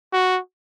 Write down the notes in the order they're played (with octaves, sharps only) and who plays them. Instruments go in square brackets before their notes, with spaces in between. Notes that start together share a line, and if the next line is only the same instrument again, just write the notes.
[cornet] F#4